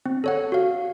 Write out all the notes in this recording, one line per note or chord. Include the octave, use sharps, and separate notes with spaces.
C4
A4 C#5 F#5
F#4 F5